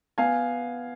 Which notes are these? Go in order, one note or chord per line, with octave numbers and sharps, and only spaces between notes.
B3 F5 G#5